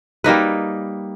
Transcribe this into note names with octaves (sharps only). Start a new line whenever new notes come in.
G3 A#3 D#4 B4